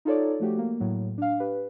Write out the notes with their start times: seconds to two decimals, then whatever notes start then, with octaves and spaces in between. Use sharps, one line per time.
0.05 D#4 F4 A4 C#5 D5
0.40 F3 A3 F#4 G4
0.58 A#3
0.80 A2 F#3
1.18 D4 F5
1.40 G4 B4